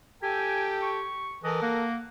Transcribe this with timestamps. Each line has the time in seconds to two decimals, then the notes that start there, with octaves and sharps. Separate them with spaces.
0.23 G4 A4 G5 G#5
0.83 C#6
1.44 E3 A4 A#4 D#5
1.62 A#3 F#5